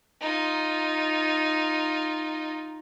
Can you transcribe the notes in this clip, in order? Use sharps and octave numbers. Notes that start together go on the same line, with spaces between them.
D#4 F4